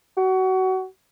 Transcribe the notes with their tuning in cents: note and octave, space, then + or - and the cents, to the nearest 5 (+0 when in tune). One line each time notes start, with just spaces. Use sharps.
F#4 +25